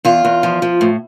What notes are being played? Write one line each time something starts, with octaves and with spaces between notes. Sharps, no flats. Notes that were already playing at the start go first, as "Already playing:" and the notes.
E2 F4
E2
F3
F3
A2